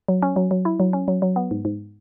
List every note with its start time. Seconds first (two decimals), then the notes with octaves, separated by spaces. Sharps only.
0.08 F#3
0.22 C#4
0.36 F#3
0.51 F#3
0.65 E4
0.80 F#3
0.93 C#4
1.08 F#3
1.22 F#3
1.36 B3
1.51 G#2
1.65 G#2